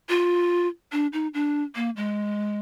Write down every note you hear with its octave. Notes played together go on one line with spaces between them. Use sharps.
F4
D4
D#4
D4
A#3
G#3